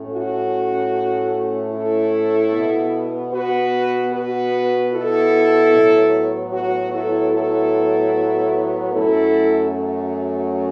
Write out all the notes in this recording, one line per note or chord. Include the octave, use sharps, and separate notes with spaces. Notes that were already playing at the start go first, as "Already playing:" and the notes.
Already playing: A2 A3 C#4
F#4
E4 A4
B2 B3
F#4 B4
F#4 B4
E4 A4
A2 F#3 B3
F#4
E4 A4
E4 A4
F#2 F#3 A3 C#4 E4 A4